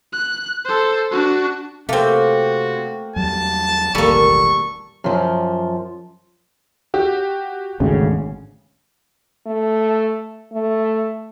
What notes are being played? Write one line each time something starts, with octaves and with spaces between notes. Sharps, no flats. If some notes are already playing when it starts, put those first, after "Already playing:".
F#6
A4 C5
D4 F#4
C3 A3 A#3 C4 F#4 G5
E2 F#3 G3 A5
E1 A1 D#2 G3 A#3 A4 C#6
F#2 F3
F#4 G4
G#1 D2 C#3
A3
A3